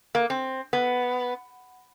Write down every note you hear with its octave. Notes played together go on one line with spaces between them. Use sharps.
A#3
C4
B3